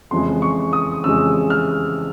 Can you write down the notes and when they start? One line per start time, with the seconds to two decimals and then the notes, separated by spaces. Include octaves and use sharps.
0.11 F2 C#3 E3 G#3 C6
0.42 C#6
0.73 D#6
1.04 F2 C#3 E3 G#3 E6
1.50 F6